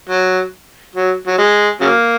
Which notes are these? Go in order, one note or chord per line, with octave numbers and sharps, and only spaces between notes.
F#3
F#3
F#3
G#3
C#3 F#3 A#3